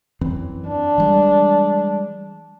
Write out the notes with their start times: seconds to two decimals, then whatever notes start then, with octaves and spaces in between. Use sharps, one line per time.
0.21 F#2 E3 C4
0.68 D4
0.98 E3 G3 G#3